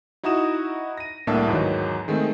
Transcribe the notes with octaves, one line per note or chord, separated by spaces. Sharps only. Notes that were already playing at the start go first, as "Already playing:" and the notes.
D#4 E4 F#4 A#5 D#6 E7
A#6 D#7
C2 A2 A#3 D4 E5 A5
E2 G#2 D#3 F#3
D#3 G#3 A3 C4